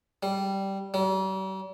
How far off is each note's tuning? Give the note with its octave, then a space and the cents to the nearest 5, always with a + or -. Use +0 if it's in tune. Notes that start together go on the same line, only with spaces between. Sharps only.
G3 -10
G3 -45